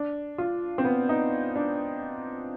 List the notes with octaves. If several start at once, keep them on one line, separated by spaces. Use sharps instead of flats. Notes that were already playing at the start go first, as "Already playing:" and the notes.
Already playing: D4
F4
C4
B3
D#4
D4